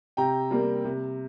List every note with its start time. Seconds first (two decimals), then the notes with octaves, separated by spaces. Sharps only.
0.17 C3 G5 A#5
0.51 G3 A#3
0.85 C3